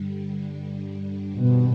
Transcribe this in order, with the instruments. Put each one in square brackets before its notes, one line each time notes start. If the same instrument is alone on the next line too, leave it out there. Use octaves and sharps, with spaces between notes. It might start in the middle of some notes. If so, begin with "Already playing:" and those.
Already playing: [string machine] G2 D3 G3
[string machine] G2 D#3 G3 C4 [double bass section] B2